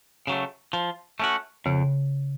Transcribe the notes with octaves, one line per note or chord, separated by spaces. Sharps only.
C#3 F#3 A3
F3
A3 C#4 F#4
F2 C#3